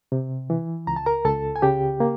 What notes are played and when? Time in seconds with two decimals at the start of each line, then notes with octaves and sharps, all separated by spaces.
0.12 C3
0.50 E3
0.87 C#2 A#5
0.96 A5
1.06 A#4 A#5
1.25 C#2 A4 A5
1.56 G#5
1.62 C#3 G4 G5
2.00 A#3